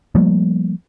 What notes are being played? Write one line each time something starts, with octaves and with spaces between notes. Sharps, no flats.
F3 G3 A3 A#3